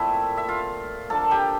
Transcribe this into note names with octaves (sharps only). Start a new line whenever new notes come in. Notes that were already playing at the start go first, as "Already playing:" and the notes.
Already playing: A#2 A3 C4 E4 E5
E5
F4 F5
D3 F3 A#3 A4 A5
G4 G5